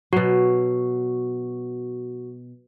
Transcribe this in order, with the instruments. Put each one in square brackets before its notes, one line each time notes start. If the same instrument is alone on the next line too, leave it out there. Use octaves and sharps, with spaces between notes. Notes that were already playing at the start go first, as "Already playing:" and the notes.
[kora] B2 F#3 [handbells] F#4